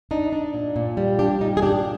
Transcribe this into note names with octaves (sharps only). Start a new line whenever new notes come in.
D4 D#4
D4
A#2
A#2
G3
D4 G4
A#2 D#4
G#4
D4 G4